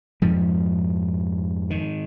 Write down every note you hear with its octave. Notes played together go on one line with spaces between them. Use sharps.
F2 G#2 F3
D#3